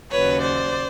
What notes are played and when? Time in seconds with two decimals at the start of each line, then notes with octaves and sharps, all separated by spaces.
0.12 D#2 C#3 F#3 B4 C#5
0.41 C5 D5